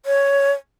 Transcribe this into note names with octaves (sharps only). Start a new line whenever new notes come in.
C#5